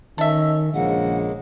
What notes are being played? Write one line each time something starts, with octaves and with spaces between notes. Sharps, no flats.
D#3 C#4 A4 D#5 E5
A#1 C#3 G#3 A#3 F#5